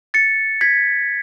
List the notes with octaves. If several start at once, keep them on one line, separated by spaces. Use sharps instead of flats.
A6 C#7
G#6 B6